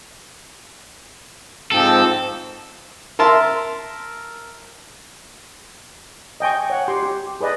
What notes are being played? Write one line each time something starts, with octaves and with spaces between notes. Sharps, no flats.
G#2 F3 C4 A4
A#4 E5 A5 C6
D#5 G5 G#5 C#6
C#5 F#5
G4 C6
G4
G#4 B4 D5 D#5